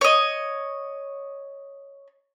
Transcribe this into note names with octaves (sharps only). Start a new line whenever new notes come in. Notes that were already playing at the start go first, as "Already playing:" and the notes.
C#5 D#5